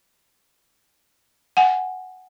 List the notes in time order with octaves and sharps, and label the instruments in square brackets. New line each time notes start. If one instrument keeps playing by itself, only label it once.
[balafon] F#5 G#5